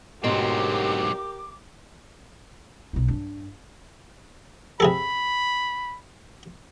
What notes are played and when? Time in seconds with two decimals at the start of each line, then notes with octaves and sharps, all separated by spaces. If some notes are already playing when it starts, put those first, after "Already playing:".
0.24 D2 G#2 B2 F#3 C4 G4 A#4 D6
2.93 B1 D#4
3.08 G2 D4
4.80 C3 G#4 A4 B5